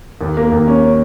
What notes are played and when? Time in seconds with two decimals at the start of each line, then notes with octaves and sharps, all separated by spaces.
0.21 D#2
0.37 A#3
0.52 D#2
0.68 C#4
0.83 C#4